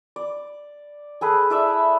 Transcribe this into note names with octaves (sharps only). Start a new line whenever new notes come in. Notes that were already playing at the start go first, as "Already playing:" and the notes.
D5
G#4 A4 B4
E4 D5 E5